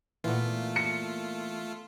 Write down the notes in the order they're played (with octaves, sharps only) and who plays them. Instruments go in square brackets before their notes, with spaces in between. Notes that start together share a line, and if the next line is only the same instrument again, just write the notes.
[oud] A#2 [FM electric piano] E3 B3 [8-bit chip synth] A3 F4
[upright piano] C#7